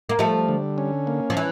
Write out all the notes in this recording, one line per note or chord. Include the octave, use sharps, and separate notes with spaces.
A#3
F3 G3 A3
D3
C#4
A#3
F3
E3